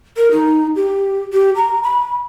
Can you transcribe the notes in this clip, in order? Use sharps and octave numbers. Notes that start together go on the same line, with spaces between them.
A#4
D#4
G4
G4
A#5
B5